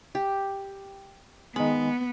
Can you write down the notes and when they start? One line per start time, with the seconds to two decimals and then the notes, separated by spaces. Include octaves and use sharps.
0.15 G4
1.56 D#3 G#3 B3 B5